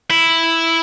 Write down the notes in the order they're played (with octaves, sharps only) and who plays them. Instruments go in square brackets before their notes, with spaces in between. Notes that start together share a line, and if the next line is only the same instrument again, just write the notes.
[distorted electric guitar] E4